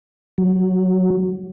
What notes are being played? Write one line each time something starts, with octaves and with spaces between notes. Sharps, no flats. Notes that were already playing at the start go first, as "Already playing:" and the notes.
F#3